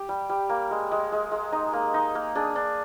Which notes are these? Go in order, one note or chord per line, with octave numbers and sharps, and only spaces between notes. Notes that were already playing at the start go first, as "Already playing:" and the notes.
Already playing: G4
G3
G3
A#3
G#3
G#3
G#3
G#3
D#4
A#3
D#4
A#3
D4 G#4
D4